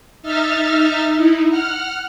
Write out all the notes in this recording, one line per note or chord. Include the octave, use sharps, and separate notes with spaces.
D#4 E5 F6 A6
D#4 E4
F#5 F6